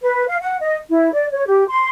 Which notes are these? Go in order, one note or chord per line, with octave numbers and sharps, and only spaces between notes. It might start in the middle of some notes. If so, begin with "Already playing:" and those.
B4
F5
F#5
D#5
E4
D5
C#5
G4
C6